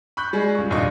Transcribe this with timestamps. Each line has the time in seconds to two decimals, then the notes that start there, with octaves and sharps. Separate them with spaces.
0.17 B5 C#6 F#6 G6
0.33 G3 G#3 G#4
0.55 C#2 C#6
0.70 F1 D#2 A#2 D4 D#5 C#6